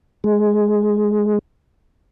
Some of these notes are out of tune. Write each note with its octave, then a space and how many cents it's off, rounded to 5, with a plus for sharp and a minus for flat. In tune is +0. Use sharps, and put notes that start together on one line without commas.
G#3 +10